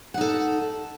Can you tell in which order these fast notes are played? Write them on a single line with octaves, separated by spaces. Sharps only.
F#5 D#4 A4